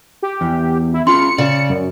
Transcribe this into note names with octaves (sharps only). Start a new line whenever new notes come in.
G4
E2
E4
C#4 F4 C6 C#7
C#3 D5
F#2